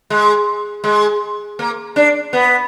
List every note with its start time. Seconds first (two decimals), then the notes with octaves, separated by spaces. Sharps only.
0.10 G#3
0.84 G#3
1.59 A#3
1.96 D4
2.33 B3